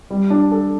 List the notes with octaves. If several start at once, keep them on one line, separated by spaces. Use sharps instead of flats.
G3
D4
A4